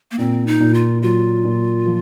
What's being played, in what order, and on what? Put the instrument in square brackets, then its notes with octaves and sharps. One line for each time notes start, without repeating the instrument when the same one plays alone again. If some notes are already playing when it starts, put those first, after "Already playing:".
[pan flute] A#3
[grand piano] A#2 [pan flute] C4
[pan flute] D#4
[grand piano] A#2
[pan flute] F4
[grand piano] F#3 [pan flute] F4
[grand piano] A#2
F3